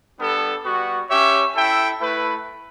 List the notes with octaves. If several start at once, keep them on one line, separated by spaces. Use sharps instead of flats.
G3 B3 D4 A4
G3 B3 F#4
C#4 G4 C#5 E5
E4 A4 E5 G5
A3 E4 B4